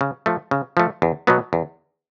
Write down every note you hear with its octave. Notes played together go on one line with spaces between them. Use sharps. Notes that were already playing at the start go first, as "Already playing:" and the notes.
C#3
F3 A3
C#3
F3 A3
E2
B2 F#3 B3
E2